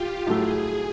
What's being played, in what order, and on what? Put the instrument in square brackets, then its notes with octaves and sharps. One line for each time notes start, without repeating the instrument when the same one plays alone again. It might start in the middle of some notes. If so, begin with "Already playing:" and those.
Already playing: [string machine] F4 G4
[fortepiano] A2 F#3 A3 [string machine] G#4